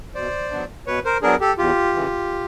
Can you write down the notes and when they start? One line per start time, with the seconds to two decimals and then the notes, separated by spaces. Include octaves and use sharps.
0.15 B2 C5 D5
0.51 F#3 B3 D4
0.86 B2 B4 C#5
1.05 A#4 C5
1.22 F#3 B3 D4 G#4 A#4
1.41 G4 A4
1.58 E2 F4 G4
1.95 C#3 E3